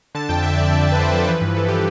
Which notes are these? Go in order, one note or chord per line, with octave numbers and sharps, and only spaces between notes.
D3 A5
F2 G5
D3 E5
F2 D5
D3 D5
D3
B4
F2 C5
F3 A4
E3 B4
G2
E3 A4
E3 G4